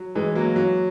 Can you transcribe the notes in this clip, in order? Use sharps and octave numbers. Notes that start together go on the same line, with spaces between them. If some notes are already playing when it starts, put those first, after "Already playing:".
Already playing: F#3
E3 G#3
F#3 A#3
F#3